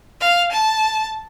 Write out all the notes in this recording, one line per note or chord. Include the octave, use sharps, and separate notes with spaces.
F5
A5